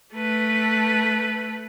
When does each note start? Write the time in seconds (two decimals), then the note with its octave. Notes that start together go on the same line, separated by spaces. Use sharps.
0.14 A3 B4